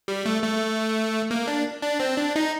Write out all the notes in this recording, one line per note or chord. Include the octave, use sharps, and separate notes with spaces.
G3
A3
A3
A#3
D4
D4
C4
D4
D#4